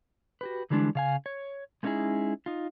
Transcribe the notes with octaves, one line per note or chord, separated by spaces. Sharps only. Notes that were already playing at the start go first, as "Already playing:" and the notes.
F#4 G4 B4
D3 E3 G3 G#3 D4
C#3 F5 G#5
C#5
G#3 A3 C#4 D#4 E4 G#4
D#4 F4